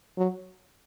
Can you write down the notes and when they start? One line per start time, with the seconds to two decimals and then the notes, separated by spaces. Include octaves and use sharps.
0.18 F#3